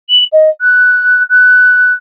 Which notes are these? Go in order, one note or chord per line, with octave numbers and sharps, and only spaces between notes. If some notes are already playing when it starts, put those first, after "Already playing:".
F#7
D#5
F#6
F#6